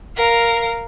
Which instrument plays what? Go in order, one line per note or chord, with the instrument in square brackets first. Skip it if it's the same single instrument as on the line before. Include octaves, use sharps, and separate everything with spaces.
[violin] A#4 F5